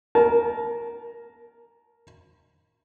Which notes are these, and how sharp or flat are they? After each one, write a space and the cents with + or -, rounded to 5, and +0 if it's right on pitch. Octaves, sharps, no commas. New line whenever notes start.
A#4 +0 A5 -30